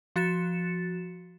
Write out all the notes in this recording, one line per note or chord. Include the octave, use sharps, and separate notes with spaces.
F3 F#4 A6 C#7 E7